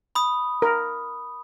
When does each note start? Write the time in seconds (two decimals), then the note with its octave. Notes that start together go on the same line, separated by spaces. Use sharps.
0.15 B5 D#6
0.62 A#4